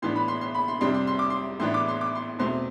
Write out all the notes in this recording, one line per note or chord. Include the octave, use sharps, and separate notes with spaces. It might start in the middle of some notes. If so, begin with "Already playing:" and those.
A2 E3 B3 D4 C6
B5
C6
C6
B5
C6
F2 C3 G3 D4 C6
C6
C6
D6
C6
A2 E3 B3 D4 C6
D6
C6
D6
C6
E2 B2 A3 C4 C6